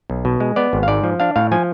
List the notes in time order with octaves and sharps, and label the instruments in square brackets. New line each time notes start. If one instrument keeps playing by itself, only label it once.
[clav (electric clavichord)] B1
B2
G#3
B3 D5
G#1
F5
G#2 D5
F3
D4 F5
A2 F5
F3 G#5